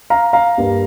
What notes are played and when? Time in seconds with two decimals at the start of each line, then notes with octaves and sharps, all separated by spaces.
0.10 F5 A#5
0.33 F5 A#5
0.58 G2 G3 A#3